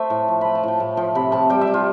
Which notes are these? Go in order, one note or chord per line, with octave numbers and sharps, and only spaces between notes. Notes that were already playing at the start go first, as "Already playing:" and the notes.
Already playing: A3 C5 E5
A2
F3
A3 B5
A5
A2 G5
A2 F5
F3 G5
C3 B5
C3 A5
G3 G5
E5
G3
F4